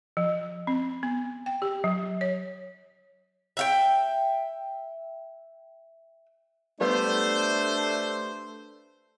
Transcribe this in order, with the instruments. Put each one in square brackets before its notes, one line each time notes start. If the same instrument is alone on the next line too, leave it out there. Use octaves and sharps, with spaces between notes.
[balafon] F3
C4
B3
G5
G4
F#3
C#5
[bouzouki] E5 F5 G5
[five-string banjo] G3 B3 [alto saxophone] A3 [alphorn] D4 [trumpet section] C5